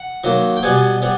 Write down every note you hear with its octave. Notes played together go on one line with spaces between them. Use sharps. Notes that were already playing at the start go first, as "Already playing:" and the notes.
Already playing: F#5
D#3 F#3 A#3
G5
B2 G3 B3 G#5
G3 B3